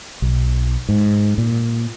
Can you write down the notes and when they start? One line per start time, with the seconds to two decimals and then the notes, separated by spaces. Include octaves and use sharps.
0.22 B1
0.89 G#2
1.38 A#2